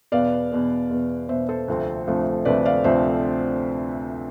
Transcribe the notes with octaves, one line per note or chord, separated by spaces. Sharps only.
E2 B2 B3 D5 F5
E2 B2 B3
E2 B2 B3
E2 B2 B3 C5 E5
A4 C5
D2 C3 F3 A3 C4
D2 C3 F3 A3 C4
D2 C3 F3 A3 C4 B4 D5
D5 F5
D2 C3 F3 A3 C4 C5 E5